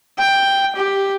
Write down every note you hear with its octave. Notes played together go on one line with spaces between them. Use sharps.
G5
G4